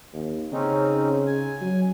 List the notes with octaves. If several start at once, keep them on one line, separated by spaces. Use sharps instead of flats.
D#2
C#3 C4 C#4 D#4
G#5
F#3